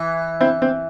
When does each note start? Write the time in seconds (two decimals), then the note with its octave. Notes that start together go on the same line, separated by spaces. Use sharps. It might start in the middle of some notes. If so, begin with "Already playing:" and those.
Already playing: E3
0.40 C4 E4
0.62 C4